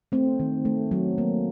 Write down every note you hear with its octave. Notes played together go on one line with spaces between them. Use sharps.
A3 C4
D#3
A3
F#3
A#3